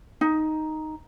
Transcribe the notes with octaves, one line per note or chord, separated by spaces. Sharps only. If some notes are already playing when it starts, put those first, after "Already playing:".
D#4